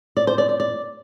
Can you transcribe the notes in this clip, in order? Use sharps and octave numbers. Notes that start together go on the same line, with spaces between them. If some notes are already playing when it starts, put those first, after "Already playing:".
D5
C5
D5
D5
D5